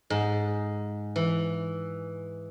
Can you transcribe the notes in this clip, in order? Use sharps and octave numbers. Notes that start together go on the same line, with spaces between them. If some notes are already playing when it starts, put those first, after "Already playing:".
G#2
E3